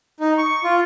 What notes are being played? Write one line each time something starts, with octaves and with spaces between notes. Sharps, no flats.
D#4
C#6
F4